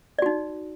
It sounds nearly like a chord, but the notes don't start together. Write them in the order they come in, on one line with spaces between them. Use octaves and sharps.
D5 F#4 D#4